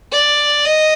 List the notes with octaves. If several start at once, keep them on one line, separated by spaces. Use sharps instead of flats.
D5
D#5